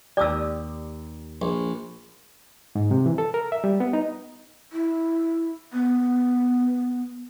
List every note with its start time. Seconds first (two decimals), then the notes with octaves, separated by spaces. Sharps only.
0.17 D#2 G4 D5 D#6 E6
1.42 A#1
2.75 G#2
2.91 C3
3.06 E3
3.18 A4
3.34 A#4
3.52 E5
3.64 G3
3.80 B3
3.93 D#4
4.73 E4
5.73 B3